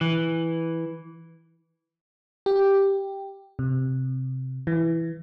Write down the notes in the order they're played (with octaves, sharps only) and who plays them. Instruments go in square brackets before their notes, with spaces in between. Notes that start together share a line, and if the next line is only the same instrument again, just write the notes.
[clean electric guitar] E3
[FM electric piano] G4
C3
E3